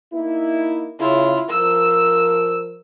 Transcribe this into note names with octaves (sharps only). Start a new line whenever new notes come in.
A#3 D#4 E4
C#3 E4 F4
F3 A#4 E6